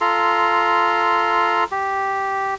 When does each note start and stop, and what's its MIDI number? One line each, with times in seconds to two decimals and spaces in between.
0.01 1.64 65
0.01 1.64 69
0.01 1.64 82
0.01 1.64 84
1.71 2.54 67